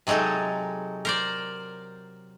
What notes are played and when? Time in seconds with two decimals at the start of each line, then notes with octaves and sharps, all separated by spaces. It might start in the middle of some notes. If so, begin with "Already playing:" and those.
0.07 C3 F#3 G#3 D#4 A4
1.05 A#4 C5 D5